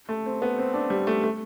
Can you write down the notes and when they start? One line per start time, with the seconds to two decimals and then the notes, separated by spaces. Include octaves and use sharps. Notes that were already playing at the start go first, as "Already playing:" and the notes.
0.09 A3
0.26 C4
0.42 B3
0.59 C4
0.74 D4
0.90 G3
1.07 A3
1.23 A3